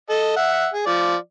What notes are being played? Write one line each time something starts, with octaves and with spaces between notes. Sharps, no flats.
A4 D#5
E5 F#5
G#4
F3 D5